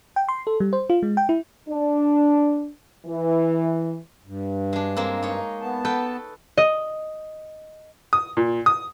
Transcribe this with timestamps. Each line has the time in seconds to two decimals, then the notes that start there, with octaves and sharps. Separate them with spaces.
0.16 G5
0.29 C6
0.47 A4
0.60 G3
0.73 C5
0.90 F4
1.03 G#3
1.17 G5
1.29 E4
1.68 D4
3.05 E3
4.26 G2
4.73 G#3 D4
4.97 G#3 A#3 C4
5.22 D#4 C#5
5.61 B3 A5
5.85 A4 B4 G5
6.57 D#5
8.13 D#6
8.37 A#2
8.66 D#6